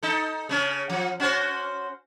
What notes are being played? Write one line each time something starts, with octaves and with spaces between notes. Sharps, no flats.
D#4 A4
C#3 C#4
F3
C#4 F#4 C5